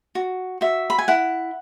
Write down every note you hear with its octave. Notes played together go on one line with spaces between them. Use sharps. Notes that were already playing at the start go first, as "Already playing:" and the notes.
F#4
F#4 E5
B5
G#5
E4 F#5